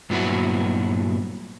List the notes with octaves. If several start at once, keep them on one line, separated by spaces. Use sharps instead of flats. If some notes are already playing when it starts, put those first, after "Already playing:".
G2 A#2 F#3 B3 E4 F#4